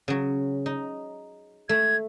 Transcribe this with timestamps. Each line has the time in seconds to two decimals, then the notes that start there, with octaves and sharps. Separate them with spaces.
0.08 C#3 F#3
0.66 D#4
1.69 A3 G#6